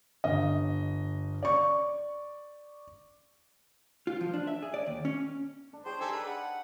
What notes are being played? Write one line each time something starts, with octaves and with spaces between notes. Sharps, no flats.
G1 D#5
D5 C#6
F4
F3
D4
E5
G#4
D5
D#2
C#4
D4
G#4 C5 C#5 G5 A5
D#4 G4 A4 G#5 A5 D6
B4
F#5